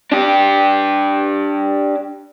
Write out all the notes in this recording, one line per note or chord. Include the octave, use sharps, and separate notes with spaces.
D4 G4